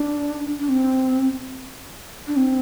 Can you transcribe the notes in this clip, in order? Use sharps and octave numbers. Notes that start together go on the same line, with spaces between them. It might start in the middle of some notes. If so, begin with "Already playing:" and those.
Already playing: D4
D4
C4
D4
C4